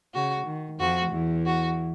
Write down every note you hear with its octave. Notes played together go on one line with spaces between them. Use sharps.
C#3 F#4
D#3
F2 F3 F#4
E2 E3
F#4